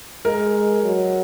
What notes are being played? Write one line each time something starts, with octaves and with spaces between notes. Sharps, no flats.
G#3 A#4
F#3